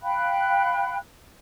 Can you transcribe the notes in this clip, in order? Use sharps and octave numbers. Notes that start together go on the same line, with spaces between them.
F5 G5 B5 F#6